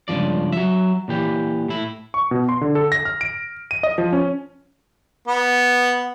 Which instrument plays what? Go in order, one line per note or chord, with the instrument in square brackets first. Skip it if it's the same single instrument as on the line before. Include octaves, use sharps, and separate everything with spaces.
[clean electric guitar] C#2 G2 B2 F3 D5
F#3 E5
A#2 E3 G4
A2 E4
[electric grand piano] C#6
B2
C6
D3
A4
A#6
F6
D7
D#7
D#5
F3
C#4
[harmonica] B3